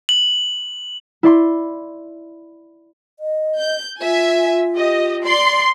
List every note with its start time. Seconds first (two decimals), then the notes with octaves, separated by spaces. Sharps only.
0.09 F#7
1.23 E4 D5 C6
3.19 D#5
3.56 G6
4.00 F4 E5 G#5
4.76 G4 D#5
5.24 D5 C6